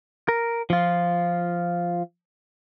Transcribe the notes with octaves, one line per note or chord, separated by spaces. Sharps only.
A#4
F3 F4